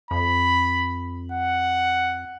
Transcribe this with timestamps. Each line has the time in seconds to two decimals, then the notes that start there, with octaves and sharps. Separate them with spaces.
0.11 F2 B5
1.32 F#5